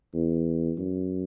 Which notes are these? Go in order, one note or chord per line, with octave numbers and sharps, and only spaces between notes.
E2
F#2